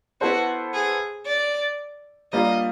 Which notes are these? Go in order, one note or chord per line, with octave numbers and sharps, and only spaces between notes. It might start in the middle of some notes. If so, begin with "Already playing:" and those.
B3 E4 F#4 A4 C5
G#4
D5
G3 A#3 D4 F4 D#5